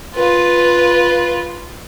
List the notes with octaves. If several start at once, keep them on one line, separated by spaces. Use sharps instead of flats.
F4 B4